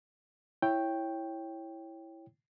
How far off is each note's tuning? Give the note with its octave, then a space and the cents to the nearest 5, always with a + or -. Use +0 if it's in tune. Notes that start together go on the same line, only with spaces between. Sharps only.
E4 +0 C#5 -10 G5 +0